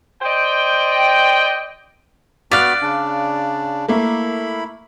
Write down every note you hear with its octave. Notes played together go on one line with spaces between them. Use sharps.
C5 D5 D#5 G5
B3 F#4 D5 F5 F#6 A6 B6
C#3 D4
A3 A#3 E4 B5